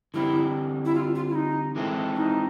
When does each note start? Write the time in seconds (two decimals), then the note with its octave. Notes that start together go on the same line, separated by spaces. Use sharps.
0.14 D3 G3 C4 E4
0.85 E4
0.95 F4
1.15 F4
1.29 E4
1.35 D#4
1.75 E3 G#3 C4 E4 A4
2.16 D#4